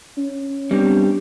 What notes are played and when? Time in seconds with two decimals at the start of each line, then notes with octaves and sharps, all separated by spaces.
0.17 C#4
0.71 G3 B3 C4 D4